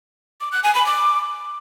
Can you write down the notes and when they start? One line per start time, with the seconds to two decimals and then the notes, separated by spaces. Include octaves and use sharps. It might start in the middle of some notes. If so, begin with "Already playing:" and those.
0.41 D6
0.52 F#6
0.63 G#5
0.75 B5
0.86 D6